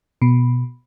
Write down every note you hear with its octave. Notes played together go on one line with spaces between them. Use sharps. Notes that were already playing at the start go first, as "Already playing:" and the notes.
B2